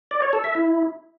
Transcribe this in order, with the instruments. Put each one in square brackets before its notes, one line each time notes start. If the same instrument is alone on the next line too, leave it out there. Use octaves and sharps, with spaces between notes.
[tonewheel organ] D5
C#5
A4
E5
E4